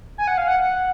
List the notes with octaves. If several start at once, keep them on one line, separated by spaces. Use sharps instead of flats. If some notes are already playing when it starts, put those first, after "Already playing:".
G#5
F#5
F5
F#5
F#5